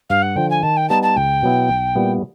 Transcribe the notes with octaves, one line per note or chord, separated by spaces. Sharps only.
G2 F5
F#5
D3 F3 G5
G#5
D#3 A5
G5
G3 B3 D#4 A5
A5
C#2 G5
B2 F#3 B3 E4
B1
A#2 G3 B3 E4